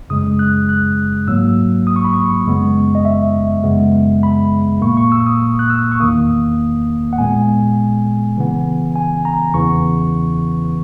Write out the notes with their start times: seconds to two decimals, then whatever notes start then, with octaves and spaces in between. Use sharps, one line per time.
0.10 F#2 C#3 G#3 D#6
0.39 F#6
0.69 F#6
1.27 G#2 F#3 A#3 E6
1.87 D#6
1.96 C#6
2.05 B5
2.14 C#6
2.46 F#2 C#3 G#3 B3
2.95 D#5
3.05 E5
3.64 F#2 C#3 G#3 B3
4.23 B5
4.81 A#2 A#3 C#6
4.97 C#6
5.12 E6
5.27 D#6
5.59 F#6
5.70 E6
5.92 C#6
6.00 E2 D#3 A#3 D#6
7.13 F#5
7.18 A#2 G#3 B3 G#5
8.37 C#3 E3 B3
8.96 G#5
9.25 A#5
9.54 E2 C#3 E3 B3 C#6